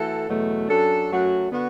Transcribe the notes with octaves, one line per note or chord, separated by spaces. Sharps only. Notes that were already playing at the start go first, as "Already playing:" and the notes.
Already playing: E3 A3 F#4 A4
E2 B2 F#3 A3
F#2 F#3 D4 A4
F#2 F#3 A3 F#4
D3 B3 F#4